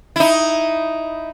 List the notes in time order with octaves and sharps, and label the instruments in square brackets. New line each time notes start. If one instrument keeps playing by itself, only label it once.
[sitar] D#4 E4